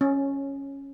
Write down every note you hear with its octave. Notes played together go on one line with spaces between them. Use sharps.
C#4